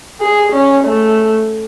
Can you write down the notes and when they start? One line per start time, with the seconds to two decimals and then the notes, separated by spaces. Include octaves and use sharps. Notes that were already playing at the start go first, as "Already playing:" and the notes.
0.21 G#4
0.52 C#4
0.84 A3